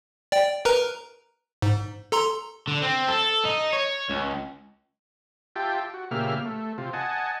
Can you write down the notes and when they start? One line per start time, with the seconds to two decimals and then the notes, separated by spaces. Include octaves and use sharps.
0.32 D5 G5
0.65 A#4 B4 A#5
1.62 G#2
2.12 A4 A#5 C6
2.68 D3
2.82 C4
3.09 A4
3.45 D#4
3.73 C#5
4.10 C#2
5.56 F4 G4 E5 G5 A5
5.94 F#4
6.11 A#2 C#3 A#3 G4 E5 F6
6.45 A3
6.78 C3 F4
6.93 D#5 F#5 G#5 A5